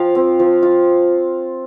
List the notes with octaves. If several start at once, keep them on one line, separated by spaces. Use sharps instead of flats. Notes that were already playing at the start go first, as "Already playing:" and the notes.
Already playing: F3 F4 F5 G5
C4
F3
F4